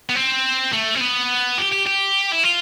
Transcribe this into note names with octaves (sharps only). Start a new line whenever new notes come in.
B3
C4
A3
C4
B3
G4
G4
G4
E4
F4